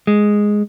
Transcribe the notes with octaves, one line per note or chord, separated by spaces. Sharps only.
G#3